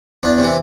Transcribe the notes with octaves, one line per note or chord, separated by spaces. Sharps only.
E2 D4
C3 E3